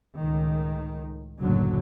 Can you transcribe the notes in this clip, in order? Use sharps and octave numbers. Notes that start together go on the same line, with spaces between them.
C#2 A2 D#3
F#1 D2 A2 D3 F#3